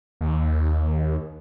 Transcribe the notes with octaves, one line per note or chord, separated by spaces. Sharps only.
D#2